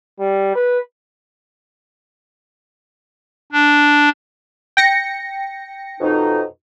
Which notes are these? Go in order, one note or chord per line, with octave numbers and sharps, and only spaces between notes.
G3
B4
D4
G5 A#6 C#7
F2 B2 D#4